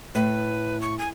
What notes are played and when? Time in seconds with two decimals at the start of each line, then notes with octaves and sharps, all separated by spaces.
0.15 A2 B4
0.81 C#6
0.98 G#5